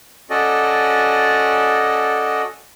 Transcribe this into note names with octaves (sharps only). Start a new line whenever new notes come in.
C#4 F#4 A4 D5 D#5